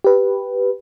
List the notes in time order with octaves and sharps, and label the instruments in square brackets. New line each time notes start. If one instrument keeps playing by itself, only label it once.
[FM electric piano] G4 B4